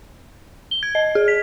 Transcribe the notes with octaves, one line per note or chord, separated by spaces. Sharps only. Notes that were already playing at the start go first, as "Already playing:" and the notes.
G7
G#6
D#5
G#4
B6